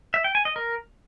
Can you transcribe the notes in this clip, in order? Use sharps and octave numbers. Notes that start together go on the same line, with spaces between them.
E5
G5
G#5
D#5
A#4